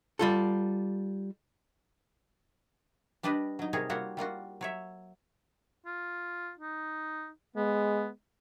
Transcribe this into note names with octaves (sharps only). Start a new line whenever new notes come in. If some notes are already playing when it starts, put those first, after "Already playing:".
G3 F4 A4
G3 D4 G4 B4 D5 D#5
F#3 D#4
C3 G3 G#4 A#4 C#5
G3 A#3 F4 F#4 C#5
G3 A#3 F4 F#4
F#3 C#5 E5
F4
D#4
G#3 B3